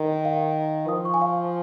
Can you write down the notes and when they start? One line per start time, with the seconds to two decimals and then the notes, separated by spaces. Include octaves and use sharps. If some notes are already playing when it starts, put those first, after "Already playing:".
Already playing: D#3
0.25 F5
0.89 F3 D#6
1.05 C#6
1.14 G#5
1.22 F5
1.37 F5